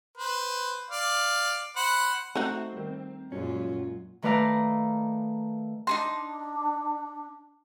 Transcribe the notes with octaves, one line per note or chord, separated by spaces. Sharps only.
B4 C5
D5 F5
C5 F#5 B5
A3 C4 D#4 F#4
D#3 G3
F#2 A#2 F3 F#3 G#3 C#4 F4
D#3 A3 B4 D5 F5 A#5
D4 D#4 G#4 C6